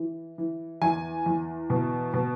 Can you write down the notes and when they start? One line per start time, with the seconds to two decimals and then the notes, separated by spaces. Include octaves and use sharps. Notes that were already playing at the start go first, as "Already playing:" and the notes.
Already playing: E3
0.38 E3
0.82 E2 G#5
1.26 E2
1.70 B2
2.14 B2